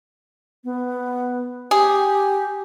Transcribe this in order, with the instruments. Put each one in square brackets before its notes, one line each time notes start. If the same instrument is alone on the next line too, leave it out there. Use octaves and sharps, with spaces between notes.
[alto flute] B3
[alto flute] G4 [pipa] G#4